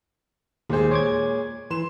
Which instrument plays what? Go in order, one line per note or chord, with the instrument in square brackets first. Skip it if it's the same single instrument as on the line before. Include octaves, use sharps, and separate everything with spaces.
[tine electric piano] D#2 C5 [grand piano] A#2 G#3 G#4
[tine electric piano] C#5 D6 G#6
[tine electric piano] E3 [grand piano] C6 E7